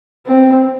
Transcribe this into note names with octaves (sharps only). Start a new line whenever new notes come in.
C4